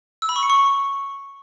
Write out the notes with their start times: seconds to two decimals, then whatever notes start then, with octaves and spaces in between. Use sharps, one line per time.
0.22 E6
0.29 B5
0.36 C#6
0.43 C#7
0.50 C#6